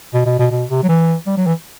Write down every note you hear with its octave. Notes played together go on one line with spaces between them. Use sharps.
B2
B2
B2
B2
C3
F#3
E3
G3
F#3
E3